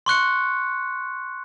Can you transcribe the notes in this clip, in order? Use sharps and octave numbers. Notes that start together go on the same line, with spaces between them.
C6 C#6 F#6 C#7